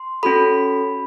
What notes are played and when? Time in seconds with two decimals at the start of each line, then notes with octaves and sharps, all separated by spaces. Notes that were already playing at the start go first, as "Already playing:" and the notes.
Already playing: C6
0.23 C#4 F#4 A4 B5